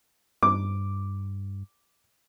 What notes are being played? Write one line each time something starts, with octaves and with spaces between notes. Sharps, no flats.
G2 D6